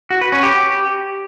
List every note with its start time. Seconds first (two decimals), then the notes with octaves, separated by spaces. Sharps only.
0.10 F#4
0.21 B4
0.32 C#4
0.43 G4